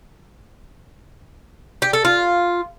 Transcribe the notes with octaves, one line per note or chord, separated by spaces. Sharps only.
G4
A4
F4